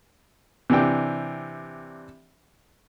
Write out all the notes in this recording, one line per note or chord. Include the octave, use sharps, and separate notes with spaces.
C3 E3 D4 G5